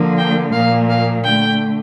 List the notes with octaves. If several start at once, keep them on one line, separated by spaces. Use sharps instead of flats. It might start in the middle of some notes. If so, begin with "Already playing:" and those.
Already playing: D3 F3 A#3
G5
A#2 F3 A#3 F5
F5
D3 A3 G5